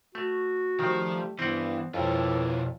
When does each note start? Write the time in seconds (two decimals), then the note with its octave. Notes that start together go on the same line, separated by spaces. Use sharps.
0.15 A3 F#4
0.79 D#3 F3 G3 A3 G4 C5
1.39 G2 E3 B3 C4 F#5
1.94 F2 B2 E4 F4 A4 B4 C#5